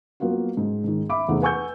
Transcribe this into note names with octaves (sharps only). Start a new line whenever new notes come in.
F#3 A#3 B3 F4 F#4
G#2
G#2 D#3
E5 B5 D6
E2 C3 A3 C4 D#4 F#5
B4 F#5 G#5 C#6 E6 G6